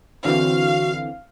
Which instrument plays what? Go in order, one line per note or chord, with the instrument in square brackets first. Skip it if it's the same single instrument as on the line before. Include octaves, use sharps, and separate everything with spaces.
[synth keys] D3 E3 C4 [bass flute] F#4 [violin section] F5